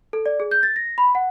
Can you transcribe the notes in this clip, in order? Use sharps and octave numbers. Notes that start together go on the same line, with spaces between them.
A4
D5
G#4
G6
A6
A#6
B5
F#5